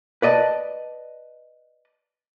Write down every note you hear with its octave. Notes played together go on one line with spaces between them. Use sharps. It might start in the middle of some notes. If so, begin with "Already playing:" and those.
B4 D5 D#5 A5